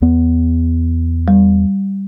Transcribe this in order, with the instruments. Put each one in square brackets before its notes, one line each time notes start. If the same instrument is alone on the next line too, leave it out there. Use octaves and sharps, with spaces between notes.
[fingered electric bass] E2 B3
[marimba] G3